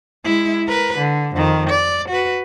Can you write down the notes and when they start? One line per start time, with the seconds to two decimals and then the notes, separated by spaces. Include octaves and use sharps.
0.24 G#3 E4
0.67 A#4 B4
0.98 D3
1.35 F2 D#3
1.70 D5
2.09 F#4 B4